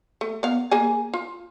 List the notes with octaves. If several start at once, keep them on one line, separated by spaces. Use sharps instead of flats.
A3
B3 F5
A#3 G#4 G#5
F4